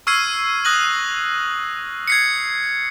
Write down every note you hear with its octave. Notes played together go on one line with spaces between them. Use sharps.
C#6 E6 F6 G#6 C7 D#7
D#6 F#6 A#6 F#7
G#6 C7 C#7